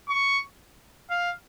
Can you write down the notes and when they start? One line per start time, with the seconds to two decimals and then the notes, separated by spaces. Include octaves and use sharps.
0.09 C#6
1.10 F5